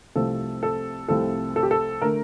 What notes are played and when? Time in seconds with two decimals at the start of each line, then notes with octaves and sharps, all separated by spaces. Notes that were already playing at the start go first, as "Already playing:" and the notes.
0.16 C2 C3 F3 A3 A4
0.63 A4
1.08 C2 C3 F3 A3 A4
1.56 A4
1.63 G4
1.71 A4
2.02 D3 A3 A#4